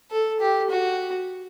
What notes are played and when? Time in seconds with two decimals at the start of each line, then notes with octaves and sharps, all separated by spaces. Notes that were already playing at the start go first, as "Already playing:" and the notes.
0.11 A4
0.40 G4
0.70 F#4